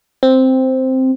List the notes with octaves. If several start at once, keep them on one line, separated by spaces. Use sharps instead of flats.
C4